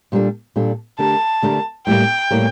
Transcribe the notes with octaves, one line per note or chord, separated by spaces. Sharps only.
A#2 G3 D4 A4
A#2 G3 D4 A4
D3 A3 D4 G4 A#4 A5
D3 A3 D4 G4 A#4
A2 G3 A#3 G5
A2 G3 A#3